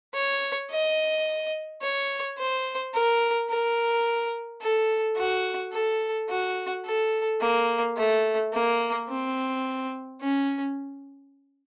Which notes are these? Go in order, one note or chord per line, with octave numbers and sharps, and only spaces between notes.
C#5
D#5
C#5
C5
A#4
A#4
A4
F#4
A4
F#4
A4
A#3
A3
A#3
C4
C#4